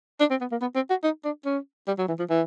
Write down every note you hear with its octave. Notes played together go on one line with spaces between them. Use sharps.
D4
C4
B3
A#3
B3
C4
F#4
D#4
D4
C#4
G3
F#3
E3
F3
E3